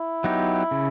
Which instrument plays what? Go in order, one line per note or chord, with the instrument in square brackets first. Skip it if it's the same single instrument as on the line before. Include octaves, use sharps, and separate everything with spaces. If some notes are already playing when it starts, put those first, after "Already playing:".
Already playing: [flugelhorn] E4
[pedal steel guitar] F#3 B3 D#4 G4
C#3